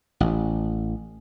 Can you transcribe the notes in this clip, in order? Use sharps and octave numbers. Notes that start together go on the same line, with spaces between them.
A1